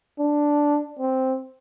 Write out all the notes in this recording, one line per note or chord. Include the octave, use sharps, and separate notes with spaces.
D4
C4